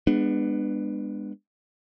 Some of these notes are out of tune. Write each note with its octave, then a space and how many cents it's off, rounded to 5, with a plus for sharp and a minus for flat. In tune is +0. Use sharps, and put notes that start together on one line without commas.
G#3 -25 B3 +0 D4 +25